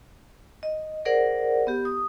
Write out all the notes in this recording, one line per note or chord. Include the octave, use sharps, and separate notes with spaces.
D#5
G#4 A#4 C5 D5 F#5
B3 G4
D#6